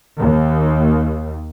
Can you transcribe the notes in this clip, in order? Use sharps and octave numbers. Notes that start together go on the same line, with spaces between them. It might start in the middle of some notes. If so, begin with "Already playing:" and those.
D#2